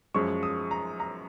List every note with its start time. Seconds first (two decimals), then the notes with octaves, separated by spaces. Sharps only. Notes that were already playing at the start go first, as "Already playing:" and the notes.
0.14 F#2 F3 G#3 C#6
0.43 D#6
0.71 A#5
1.00 A#5